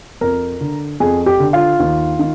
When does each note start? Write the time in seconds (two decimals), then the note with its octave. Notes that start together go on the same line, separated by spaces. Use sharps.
0.21 F2 A#4
0.61 D3
1.00 F2 G#4
1.26 G4
1.40 D3
1.53 F4
1.80 D#2
2.19 D#3